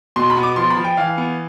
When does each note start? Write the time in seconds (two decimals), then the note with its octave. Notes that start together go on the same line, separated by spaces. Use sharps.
0.16 B2 C6
0.30 B5
0.37 B3
0.43 D6
0.56 F3 C6
0.70 B5
0.77 F3
0.84 G5
0.97 E3 F5
1.18 B3